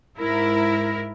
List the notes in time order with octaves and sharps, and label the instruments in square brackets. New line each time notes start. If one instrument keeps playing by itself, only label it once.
[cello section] G#2 E4 A#4